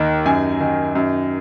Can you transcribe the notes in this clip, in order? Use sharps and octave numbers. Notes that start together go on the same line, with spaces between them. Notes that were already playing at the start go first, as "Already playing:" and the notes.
Already playing: D#2 D#3
F#2 G#5
D#3
F#2